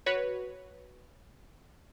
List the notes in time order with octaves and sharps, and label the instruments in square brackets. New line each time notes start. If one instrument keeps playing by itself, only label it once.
[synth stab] F#4 B4 C#5